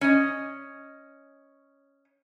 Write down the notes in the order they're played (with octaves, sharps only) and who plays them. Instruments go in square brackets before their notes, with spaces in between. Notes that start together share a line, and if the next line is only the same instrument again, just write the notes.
[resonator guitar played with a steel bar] C#4 D#5